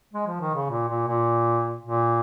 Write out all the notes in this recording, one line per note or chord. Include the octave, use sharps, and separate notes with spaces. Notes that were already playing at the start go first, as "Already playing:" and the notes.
G#3
F3
D#3
C#3
A#2
A#2
A#2
A#2